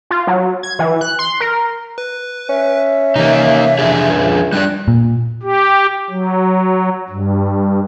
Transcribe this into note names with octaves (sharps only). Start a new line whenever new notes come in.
F4
F#3
G#6
E3
F#6
C6
A#4
B4
C#4 E5
C3 E3 A#3 D#4
F2 D4 G#4
C#2
G3 D4 D5 F#6
A#2
G4
F#3
G2